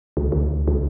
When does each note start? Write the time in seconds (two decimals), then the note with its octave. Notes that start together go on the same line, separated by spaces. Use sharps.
0.17 C#2
0.32 D2
0.68 C#2